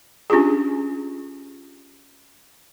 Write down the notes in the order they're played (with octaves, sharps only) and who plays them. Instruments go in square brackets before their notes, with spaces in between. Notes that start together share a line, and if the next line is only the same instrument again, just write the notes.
[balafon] C#4 D4 F4 G4 G#4